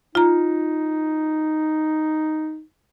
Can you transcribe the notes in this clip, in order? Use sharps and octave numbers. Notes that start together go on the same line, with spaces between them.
D#4 F4 A#5